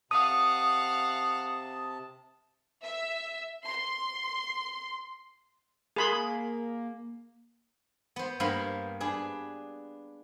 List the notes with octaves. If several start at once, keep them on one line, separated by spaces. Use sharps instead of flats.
C3 F5 F#5 A5 D#6
E5
C6
A#3 G#4 B5 C6
B3 C5
G2 A#3 B3 C5 F5 B5
D4 G#4 B4